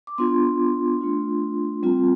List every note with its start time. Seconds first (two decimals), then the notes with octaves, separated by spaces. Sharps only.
0.07 D6
0.18 B3 D4 F4 C6
1.01 A3 D4 F4
1.83 G3 C4 F4